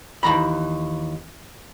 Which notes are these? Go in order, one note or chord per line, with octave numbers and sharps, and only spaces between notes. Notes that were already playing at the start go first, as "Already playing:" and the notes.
D#2 E3 A#5 B5